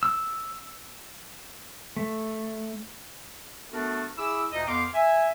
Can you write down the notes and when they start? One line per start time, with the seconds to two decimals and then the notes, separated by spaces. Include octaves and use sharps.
0.03 E6
1.97 A3
3.71 A3 B3 D4 F#4 A4 A#4
4.18 E4 G#4 D6 E6
4.51 D2 A#2 D#4 D#5
4.66 F2 B3 F5 C6 D6
4.92 E5 G#5